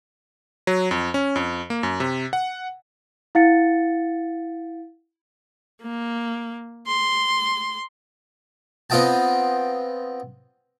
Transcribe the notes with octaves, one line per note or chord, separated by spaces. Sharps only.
F#3
F2
C#4
F2
A#3
F#2
C3
F#5
E4 F5 F#5 A6 C#7
A#3
C6
B3 C4 F4 D#5 G5 A5